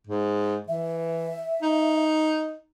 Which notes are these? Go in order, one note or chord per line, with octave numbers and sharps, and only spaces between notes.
G#2
E3 E5
D#4